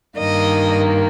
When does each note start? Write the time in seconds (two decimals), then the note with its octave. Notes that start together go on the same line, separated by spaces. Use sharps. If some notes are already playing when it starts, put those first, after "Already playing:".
0.18 G2 D#3 A#3 D#5